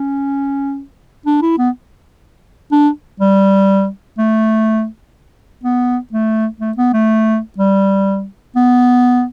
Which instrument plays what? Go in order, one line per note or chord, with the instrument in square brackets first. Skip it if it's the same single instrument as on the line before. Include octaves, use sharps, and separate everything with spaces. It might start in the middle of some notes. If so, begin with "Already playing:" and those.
Already playing: [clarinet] C#4
D4
E4
B3
D4
G3
A3
B3
A3
A3
B3
A3
G3
B3